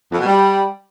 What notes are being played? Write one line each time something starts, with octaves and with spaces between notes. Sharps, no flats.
F2
B2
G3